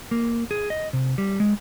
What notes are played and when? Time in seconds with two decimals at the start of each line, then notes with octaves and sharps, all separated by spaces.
0.11 A#3
0.51 G#4
0.70 D#5
0.93 C3
1.18 G3
1.40 G#3